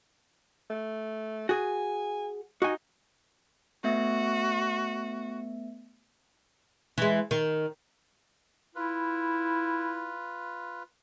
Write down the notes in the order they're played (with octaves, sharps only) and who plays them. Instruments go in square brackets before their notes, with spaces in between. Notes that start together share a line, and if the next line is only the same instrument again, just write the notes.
[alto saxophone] A3
[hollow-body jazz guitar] F#4 G#4 [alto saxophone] G#5
[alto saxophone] D#4 [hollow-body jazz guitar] F#4 G#5
[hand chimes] A3 B3 E5 [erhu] F#4
[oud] E3 G#3
D#3
[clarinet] E4 [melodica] F4 B4